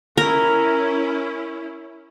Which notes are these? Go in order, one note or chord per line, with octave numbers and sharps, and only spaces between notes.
C#4 E4 A#4